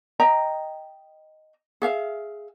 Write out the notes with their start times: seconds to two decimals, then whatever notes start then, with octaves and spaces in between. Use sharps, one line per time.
0.20 D#5 G5 A#5
1.82 G#4 E5 F5